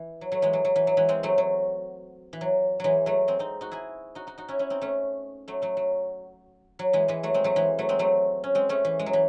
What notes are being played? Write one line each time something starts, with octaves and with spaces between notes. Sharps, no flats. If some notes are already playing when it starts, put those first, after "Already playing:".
Already playing: E3
F#3
F#3 A3
E3 G#3
F#3
F#3
E3
F#3
E3 G#3
G#3 C4
F#3 A3
F#3
E3
F#3
E3 F#3 G#3
F#3 A3
G#3 C4
C4 D#4
D#4 F#4
E4 G#4
D#4 F#4
D#4 F#4
D#4 F#4
C#4 E4
C#4 E4
C4 D#4
A3 C#4
F#3 A3
F#3 A3
F#3
F#3
E3 G#3
E3 G#3
F#3 A3
G#3 C4
F#3 A3
E3 G#3
F#3 A3
G#3 C4
F#3 A3
C#4
G#3 C4
A3 C#4
E3
G#3
F#3
E3